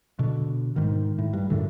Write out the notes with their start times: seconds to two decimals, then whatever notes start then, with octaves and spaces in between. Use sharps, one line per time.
0.19 B2 D3
0.76 G#2 D#3
1.18 A2
1.33 G2
1.50 F#2 A2 D3